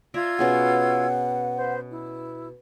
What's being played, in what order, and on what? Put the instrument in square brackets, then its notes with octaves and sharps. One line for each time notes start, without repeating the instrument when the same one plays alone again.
[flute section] F4 E6 G#6 [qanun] D5 E5 A#5
[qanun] B2 C#4 G#4 [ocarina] F#5
[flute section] B4 C5
E4